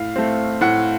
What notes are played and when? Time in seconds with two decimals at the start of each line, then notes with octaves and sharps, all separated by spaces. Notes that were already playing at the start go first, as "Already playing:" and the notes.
Already playing: A2 F5
0.16 A3 C4
0.61 A2 F#5